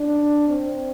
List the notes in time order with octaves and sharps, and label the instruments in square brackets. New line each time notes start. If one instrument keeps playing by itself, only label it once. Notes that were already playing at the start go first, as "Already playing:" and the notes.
Already playing: [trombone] D4
C4